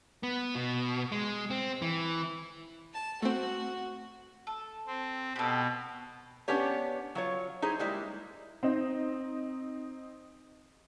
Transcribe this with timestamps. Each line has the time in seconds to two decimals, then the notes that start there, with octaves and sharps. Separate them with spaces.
0.23 B3
0.55 B2
1.12 G#3
1.50 C4
1.82 E3
2.94 A5
3.22 A3 C4 F#4
4.47 A4
4.87 C4
5.36 B2 G4 A4
6.48 B3 C#4 D4 G4 C#5
7.15 F#3 F4 C#5
7.62 D#4 E4 G#4 C5
7.79 G3 G#3 A#3 E4
8.63 C4 D#4